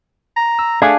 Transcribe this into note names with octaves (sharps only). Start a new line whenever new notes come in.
A#5
E6
A3 D4 G#4 F5 F#6 G#6